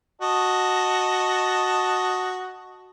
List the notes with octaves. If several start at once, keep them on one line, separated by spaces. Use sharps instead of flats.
F#4 D#5 A5